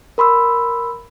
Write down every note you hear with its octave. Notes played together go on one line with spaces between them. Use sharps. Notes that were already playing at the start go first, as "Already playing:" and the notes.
A#4 B5 C6 E6